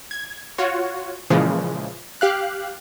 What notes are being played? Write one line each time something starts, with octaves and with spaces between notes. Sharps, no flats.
G#6
F4 F#4 C#5
A#2 C#3 E3 F3 G#3
G4 F5 F#6